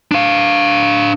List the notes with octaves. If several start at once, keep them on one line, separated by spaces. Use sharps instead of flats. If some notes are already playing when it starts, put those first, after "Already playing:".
D4 F5